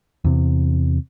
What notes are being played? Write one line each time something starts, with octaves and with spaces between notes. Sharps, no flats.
E2 C3